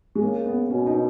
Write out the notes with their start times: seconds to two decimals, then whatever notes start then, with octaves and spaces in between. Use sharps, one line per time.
0.15 G#3
0.22 C#3 A#3
0.46 B3
0.70 B2 C#4
0.86 D#4